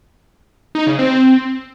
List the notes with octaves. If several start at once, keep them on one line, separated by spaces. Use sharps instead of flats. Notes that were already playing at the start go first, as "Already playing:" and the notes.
D#4
C#3
C4